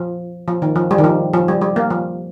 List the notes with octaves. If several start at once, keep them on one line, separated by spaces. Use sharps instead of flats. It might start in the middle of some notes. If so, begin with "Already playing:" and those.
Already playing: F3
F3
D#3
F3
G3
D#3
F3
F3
G3
G3
A#3
F3